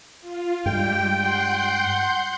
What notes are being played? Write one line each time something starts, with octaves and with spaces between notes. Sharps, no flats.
F4
G2 G3 G#3 G5
F#5 C6 G6